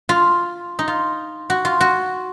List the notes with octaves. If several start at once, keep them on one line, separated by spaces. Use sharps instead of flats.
F4
D#4
F4
F#4
F4
F#4